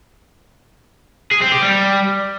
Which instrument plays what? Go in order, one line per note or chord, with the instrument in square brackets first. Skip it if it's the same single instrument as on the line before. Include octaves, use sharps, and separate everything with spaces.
[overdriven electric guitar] G#4
C4
G4
G3